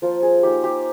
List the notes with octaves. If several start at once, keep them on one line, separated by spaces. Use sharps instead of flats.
F3 A#3 F4 C5
G#4
A#3 D#4 G4
G4